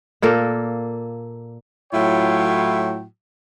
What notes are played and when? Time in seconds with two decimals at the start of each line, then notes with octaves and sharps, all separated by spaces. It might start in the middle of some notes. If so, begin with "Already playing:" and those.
0.22 A#2 A#3 A4 A#4
1.93 A2 F#3 E4 F4 C#5 G5